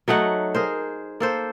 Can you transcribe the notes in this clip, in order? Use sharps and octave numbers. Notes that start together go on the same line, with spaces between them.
F#3 A3 D#4 F#5
G#4 A#4 C5
A#3 A4 C5